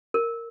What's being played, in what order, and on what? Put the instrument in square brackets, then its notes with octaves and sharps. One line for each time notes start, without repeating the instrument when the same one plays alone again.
[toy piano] A#4